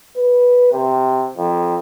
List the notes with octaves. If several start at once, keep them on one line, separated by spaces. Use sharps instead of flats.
B4
C3
F2